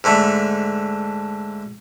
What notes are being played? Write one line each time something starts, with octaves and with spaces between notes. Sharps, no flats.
G#2 D3 A3